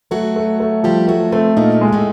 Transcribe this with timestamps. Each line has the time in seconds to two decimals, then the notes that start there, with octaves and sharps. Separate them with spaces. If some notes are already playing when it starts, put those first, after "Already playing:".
0.11 F#3 A3 F#4
0.36 A3
0.60 A3
0.84 F3 G3 G4
1.08 F#3 A3 F#4
1.32 C3 A3 C4
1.57 A#2 A#3 D#4
1.81 G#3
1.93 A2 A3